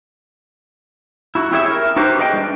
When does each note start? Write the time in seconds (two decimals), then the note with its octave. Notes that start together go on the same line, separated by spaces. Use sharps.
1.35 E4 F#4
1.52 C4 E4 G4 G#4 C#5 E5
1.70 A#4
1.96 D#4 F#4 G4 B4 C5
2.18 G#4 B4 D#5 F5 G5
2.33 G3 D4